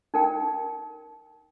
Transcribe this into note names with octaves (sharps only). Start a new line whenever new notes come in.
D#4 A#4 G5